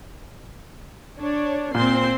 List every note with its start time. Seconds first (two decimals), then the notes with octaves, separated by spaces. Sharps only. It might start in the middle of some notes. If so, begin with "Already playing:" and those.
1.19 D4 C#5
1.75 A#2 C4 C5 C6